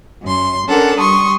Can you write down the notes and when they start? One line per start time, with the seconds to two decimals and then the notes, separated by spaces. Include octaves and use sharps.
0.24 F#2 C6
0.67 C#4 D4 A4 A#4 F#5
0.99 G3 C6 C#6 D#6